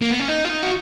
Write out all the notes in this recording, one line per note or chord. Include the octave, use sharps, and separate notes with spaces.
A#3
B3
C#4
D#4
F4
D#4
F#4